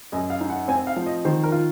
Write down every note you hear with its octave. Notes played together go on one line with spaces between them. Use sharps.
F#2 D#5
F5
D#4
F#5
C4 G#5
F5
F3
D#5
D#3 C5
A#4
F4